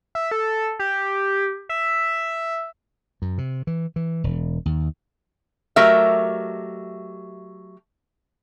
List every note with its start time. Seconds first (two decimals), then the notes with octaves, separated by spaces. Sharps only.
0.15 E5
0.31 A4
0.79 G4
1.69 E5
3.22 F#2
3.38 C3
3.67 E3
3.96 E3
4.24 E1
4.66 D#2
5.76 F#3 A3 G4 A#4 D#5 E5